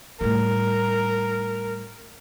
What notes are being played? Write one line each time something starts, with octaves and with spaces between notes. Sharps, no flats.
A2 G3 A#4